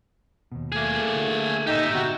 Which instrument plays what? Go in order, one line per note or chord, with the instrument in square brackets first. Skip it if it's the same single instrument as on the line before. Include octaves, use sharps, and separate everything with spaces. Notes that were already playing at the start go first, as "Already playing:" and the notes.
[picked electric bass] D#2 B2
[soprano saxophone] A3 [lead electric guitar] A#3 G#4
[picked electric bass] D3
[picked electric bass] G#1 A#2 [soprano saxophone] D#4 [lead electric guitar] G4 E5
[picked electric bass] A#2 D3 B3 [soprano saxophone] F#4